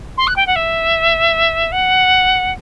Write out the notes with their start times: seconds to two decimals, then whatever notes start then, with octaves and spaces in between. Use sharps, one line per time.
0.17 C6
0.27 F#6
0.36 G5
0.47 F#5
0.55 E5
1.72 F#5